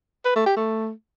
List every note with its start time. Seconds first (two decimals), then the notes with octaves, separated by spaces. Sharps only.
0.25 B4
0.35 A3
0.46 G4
0.56 A3